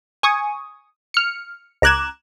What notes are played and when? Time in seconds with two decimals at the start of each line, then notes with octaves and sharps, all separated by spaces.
0.23 G#5 C#6 D#6
1.14 F6 C#7
1.82 C#2 A#5 D6 F#6 G#6 E7